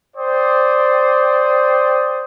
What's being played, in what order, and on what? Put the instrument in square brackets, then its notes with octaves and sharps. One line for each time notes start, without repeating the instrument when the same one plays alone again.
[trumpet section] C5 D5 G5 D#6